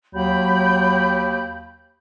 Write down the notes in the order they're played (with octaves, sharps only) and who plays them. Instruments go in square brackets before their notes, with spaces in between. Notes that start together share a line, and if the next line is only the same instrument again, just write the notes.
[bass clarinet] D#2 [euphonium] F#3 [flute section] G5 B5 G6